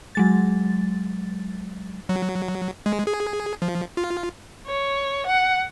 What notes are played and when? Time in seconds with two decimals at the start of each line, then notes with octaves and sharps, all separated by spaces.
0.15 F#3 G#3 A6
2.09 F#3
2.86 G#3
3.07 G#4
3.62 F3
3.97 F4
4.66 C#5
5.26 F#5